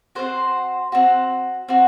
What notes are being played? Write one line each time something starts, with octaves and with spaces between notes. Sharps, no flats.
C4 F#4 C5
C4 F#4
C4 F#4